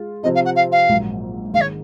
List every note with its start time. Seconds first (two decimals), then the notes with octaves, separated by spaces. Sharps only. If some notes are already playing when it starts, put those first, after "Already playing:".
Already playing: G#3 F4
0.23 C3 F3 C4 D#5
0.35 F5
0.45 F#5
0.55 F5
0.72 F5
0.89 A#1 G#2 F#3 A#3
1.53 G#2 D#3 G#3 F5
1.61 C#5